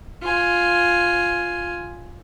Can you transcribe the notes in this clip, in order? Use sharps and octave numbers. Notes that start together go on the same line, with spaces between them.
F4 G#5